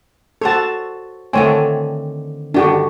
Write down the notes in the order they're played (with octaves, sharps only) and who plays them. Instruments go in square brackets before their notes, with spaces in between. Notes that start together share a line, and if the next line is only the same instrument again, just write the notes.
[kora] F#4 C5 C#5 [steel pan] A4 A5
[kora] D3 D#3 C4 [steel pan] A3 C#5 G#5
[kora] G2 D3 D#3 [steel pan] D4 F#4 G4